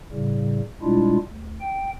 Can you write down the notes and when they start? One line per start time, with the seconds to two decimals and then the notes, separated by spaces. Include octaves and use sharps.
0.12 A2 C#3 G3
0.82 B2 G3 G#3 D4 E4 F4
1.29 D2
1.61 G5